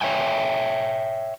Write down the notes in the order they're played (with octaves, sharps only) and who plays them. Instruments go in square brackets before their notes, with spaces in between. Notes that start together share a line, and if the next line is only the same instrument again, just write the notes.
[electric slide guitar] C#5 D#5 E5 G5 G#5